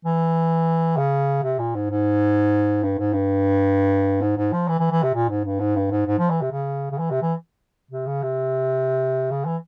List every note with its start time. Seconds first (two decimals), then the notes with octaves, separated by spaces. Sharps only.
0.05 E3
0.97 C#3
1.43 C3
1.59 A#2
1.75 G#2
1.90 G#2
2.83 G2
2.98 G#2
3.13 G2
4.21 G#2
4.37 G#2
4.52 F3
4.68 E3
4.79 E3
4.91 E3
5.03 C3
5.14 A#2
5.29 G#2
5.45 G2
5.60 G#2
5.76 G2
5.91 G#2
6.07 G#2
6.18 F3
6.30 E3
6.41 C3
6.52 C#3
6.91 C#3
6.98 E3
7.11 C3
7.22 E3
7.91 C3
8.06 C#3
8.23 C3
9.31 C#3
9.45 E3